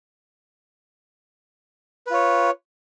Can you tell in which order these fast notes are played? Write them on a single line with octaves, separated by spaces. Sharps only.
B4 F4 C#5